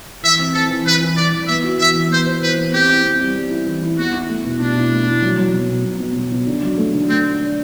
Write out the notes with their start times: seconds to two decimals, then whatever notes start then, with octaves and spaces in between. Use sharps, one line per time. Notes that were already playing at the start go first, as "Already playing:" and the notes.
0.23 E3 E5
0.39 C4
0.54 E3 A4
0.70 E3
0.86 E3 B4
1.01 E3
1.17 E3 D5
1.33 E3
1.48 B3 E5
1.64 F#4
1.79 E3 E5
1.95 E3
2.10 B3 C5
2.26 C5
2.42 E3 B4
2.57 B3
2.73 C4 G4
2.89 E4
3.04 C4
3.20 G3
3.36 G3
3.51 E4
3.66 E3
3.82 E4
3.98 E2 F#4
4.13 E4
4.30 A3
4.44 B2
4.60 B2 D4
4.75 E4
4.92 A3
5.07 E4
5.22 F#3
5.38 F#3
5.53 B2
5.69 B2
5.85 B2
6.00 B2
6.16 B2
6.32 B2
6.47 D3
6.63 F#3
6.78 A3
6.94 D3
7.09 A3 C4
7.25 D4
7.41 D4